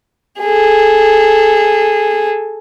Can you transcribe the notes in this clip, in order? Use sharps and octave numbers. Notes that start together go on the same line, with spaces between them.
G#4 A4